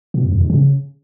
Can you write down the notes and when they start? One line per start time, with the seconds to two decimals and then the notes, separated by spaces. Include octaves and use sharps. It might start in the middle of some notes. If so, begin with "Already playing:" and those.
0.14 B2
0.23 F#2
0.32 E2
0.41 G#2
0.50 C#3